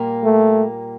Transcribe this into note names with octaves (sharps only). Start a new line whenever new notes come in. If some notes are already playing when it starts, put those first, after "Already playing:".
Already playing: A#2 G3 A#3
A3